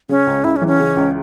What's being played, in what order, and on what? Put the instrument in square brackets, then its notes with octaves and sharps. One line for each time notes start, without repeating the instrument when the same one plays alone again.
[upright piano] C#3 [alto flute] C#4
[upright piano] C#2
[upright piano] C#2 [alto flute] E4
[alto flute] C#4
[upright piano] E3
[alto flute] C#4
[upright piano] C#3
C#2